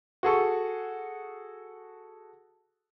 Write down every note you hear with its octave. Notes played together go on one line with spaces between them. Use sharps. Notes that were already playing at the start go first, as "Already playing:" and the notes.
F#4 G#4 A4 C#6